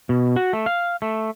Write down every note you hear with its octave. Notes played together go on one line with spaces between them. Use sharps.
B2
F#4
A3
F5
A3